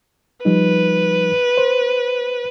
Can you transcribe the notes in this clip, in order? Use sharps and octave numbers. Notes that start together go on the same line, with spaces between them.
F3 G3 D#4 B4
C5